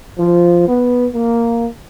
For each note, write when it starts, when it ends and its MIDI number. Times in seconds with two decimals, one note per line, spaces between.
0.18 0.65 53
0.68 1.06 59
1.14 1.67 58